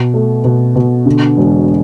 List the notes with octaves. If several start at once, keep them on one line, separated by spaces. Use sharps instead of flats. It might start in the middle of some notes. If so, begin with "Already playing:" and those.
Already playing: B2
A3
B2
B2
D3
E1